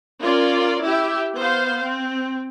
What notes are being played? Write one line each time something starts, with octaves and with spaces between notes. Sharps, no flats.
C#4 F4 A#4 D5
E4 G4 E5
B3 C5 F5
C4